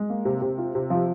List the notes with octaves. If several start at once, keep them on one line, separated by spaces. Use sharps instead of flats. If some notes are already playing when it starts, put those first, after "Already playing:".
Already playing: G#3
A#3
C3
C3
F4
C3
F3